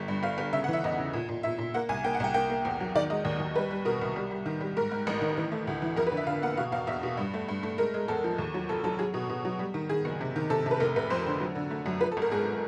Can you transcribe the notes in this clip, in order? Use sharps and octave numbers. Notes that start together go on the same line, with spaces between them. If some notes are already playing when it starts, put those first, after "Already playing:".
Already playing: G1 G3
G2
G1 F5
G1
C#3 E5
F#5
E3
E5
E2 D#5
C#3
A#2
A#2
A#2 E5
A#2
A#3 F#5
C2 G#5
A#3 G5
F#5
C2 G5
A#3 G5
A#3
E2
F#3
D#3 D5
G#3 D#5
D#2
D#2
G3 B4
G3
B2 A#4
C2
G3
G3
D#3
G3
G#2 A#4
G#2
A1
D#3
E3
A3
D2
E3
F2 A#4
B4
D3
E5
D3 F5
A#3 F#5
B2 F5
E2 F5
E2 E5
B2
G2
A3
G2
A3
G#3 A#4
G#3
E2 A4
F3
D#2
F#3
F1 A4
F#3 A4
F#3 G#4
B2
B2
F#3
G3
D#3
D#3 G#4
F#1
C3
D#3
C3 A4
C3
B4
F1 A#4
F1 B4
F2 C5
D3
F#3
D3
A3
F#2
F3 B4
A4
G#1 A#4
G#2 G#4